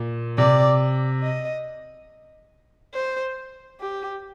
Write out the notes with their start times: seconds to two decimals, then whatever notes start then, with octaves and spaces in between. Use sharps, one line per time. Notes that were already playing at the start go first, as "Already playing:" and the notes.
Already playing: A#2
0.38 C3 D5
1.24 D#5
2.94 C5
3.80 G4